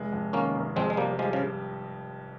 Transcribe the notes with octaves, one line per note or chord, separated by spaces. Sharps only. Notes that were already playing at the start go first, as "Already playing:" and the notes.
Already playing: F1 G#3
F2
D#3 A#3 C#4
F1
F2 G#3 C4
G#3
C3 G3 A#3
F3 G3 G#3
C#3 F3